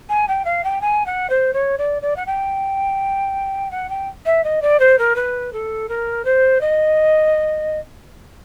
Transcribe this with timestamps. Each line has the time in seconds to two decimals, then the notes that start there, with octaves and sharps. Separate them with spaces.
0.09 G#5
0.28 G5
0.45 F5
0.64 G5
0.81 G#5
1.06 F#5
1.30 C5
1.53 C#5
1.78 D5
2.02 D5
2.16 F#5
2.26 G5
3.71 F#5
3.89 G5
4.25 E5
4.44 D#5
4.62 D5
4.79 C5
4.98 A#4
5.15 B4
5.52 A4
5.89 A#4
6.25 C5
6.61 D#5